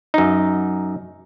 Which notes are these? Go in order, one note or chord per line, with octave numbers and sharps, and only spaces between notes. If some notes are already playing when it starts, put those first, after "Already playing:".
F#2 D#4